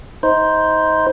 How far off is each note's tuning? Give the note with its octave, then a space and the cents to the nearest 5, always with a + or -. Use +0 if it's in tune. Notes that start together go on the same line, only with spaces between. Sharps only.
D#4 +25 C5 +0